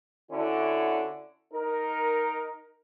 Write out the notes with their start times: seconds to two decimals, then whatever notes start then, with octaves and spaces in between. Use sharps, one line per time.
0.31 D3 C#4 E4 F#4
1.53 D#4 A#4